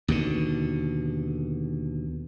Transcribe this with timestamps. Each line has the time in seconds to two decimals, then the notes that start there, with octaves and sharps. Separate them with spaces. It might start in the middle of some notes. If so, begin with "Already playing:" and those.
0.08 D#2 B2 D3